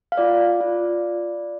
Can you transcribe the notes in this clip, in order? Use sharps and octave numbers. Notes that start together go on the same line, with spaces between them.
F5
F4 D5
F4